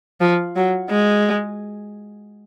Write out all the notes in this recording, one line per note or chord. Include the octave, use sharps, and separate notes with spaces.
F3
F#3
G#3